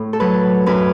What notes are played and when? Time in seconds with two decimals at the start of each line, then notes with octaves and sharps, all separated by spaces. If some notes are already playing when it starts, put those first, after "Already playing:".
Already playing: A2
0.13 A4
0.20 F#3 B4
0.66 F#2 B4